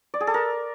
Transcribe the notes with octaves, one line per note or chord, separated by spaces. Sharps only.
D5
G#4
A4
A#4